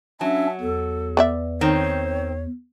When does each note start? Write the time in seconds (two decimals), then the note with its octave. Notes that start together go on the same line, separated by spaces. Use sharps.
0.21 F#3 C#4 D4 E5
0.61 E2 A4
1.17 B3 D5 E5
1.61 D#3 C4 C#5